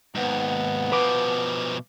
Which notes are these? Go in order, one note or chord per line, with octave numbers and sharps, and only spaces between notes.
D#2 G#2 B3
B2 F3 B4 D6